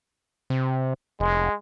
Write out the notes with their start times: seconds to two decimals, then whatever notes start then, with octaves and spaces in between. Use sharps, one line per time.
0.50 C3
1.20 F1 G#3